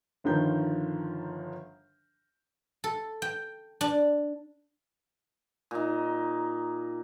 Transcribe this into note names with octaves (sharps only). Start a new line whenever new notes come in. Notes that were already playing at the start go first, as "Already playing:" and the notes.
G1 D3 D#3 F3 A#4 G6
A4
G5
D4
A#2 D#4